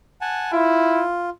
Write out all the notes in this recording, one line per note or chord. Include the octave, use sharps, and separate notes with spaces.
F#5 G#5 A5
E4 F4